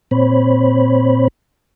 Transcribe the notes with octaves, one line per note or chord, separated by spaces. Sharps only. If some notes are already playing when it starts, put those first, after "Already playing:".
A#2 C4 C5 C#5 B5